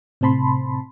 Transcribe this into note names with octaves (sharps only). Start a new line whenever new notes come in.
A2 C3 C4 A5 B5 C6